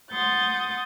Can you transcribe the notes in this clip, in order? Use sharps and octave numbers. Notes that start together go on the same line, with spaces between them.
F#5 C6 D#6 G6 A6